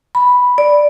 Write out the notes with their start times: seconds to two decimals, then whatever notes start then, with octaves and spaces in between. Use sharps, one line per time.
0.15 B5
0.58 D5